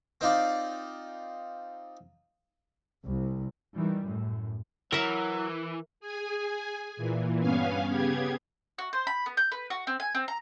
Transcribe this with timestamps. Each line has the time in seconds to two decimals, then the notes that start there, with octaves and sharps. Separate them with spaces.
0.21 C4 D#4 F4 D5
3.06 C2
3.75 D#3 E3 G3
4.04 F#2 A2
4.92 E3 F#3 A#4 E5
6.00 G#4 G#5
6.97 A#2 E3
7.41 G2 B3 C#4 F5 G#5
7.88 C#3 B3 G4 G#4 G#6
8.78 F#4
8.93 C5
9.07 B5
9.26 B3
9.37 G6
9.52 B4
9.70 F#4
9.87 C4
10.00 G#5
10.15 C4
10.28 A#5